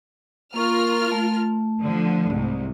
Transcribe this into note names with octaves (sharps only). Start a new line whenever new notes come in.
A#3 F4 A#4 C#6 F6
A3
D3 F3
C2 G#2